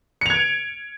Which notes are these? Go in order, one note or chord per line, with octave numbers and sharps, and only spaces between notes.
G#6 C#7 D7 F7